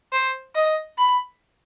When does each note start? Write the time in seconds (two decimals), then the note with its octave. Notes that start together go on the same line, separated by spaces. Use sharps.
0.12 C5
0.55 D#5
0.98 B5